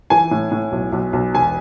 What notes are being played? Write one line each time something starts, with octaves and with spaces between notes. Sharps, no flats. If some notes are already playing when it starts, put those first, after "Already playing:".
E3 G#5
A2
A2
B1
B1
B1
E1 G#5